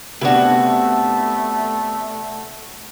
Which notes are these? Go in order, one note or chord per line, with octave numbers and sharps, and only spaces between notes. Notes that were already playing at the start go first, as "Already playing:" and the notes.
C3 A3 B3 D4 E4 F#4